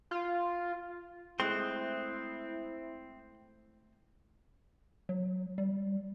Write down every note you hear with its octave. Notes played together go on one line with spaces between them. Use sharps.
F4
G#3 A3 C4 E4 C5 C6 D#6 F#6
F#3
G3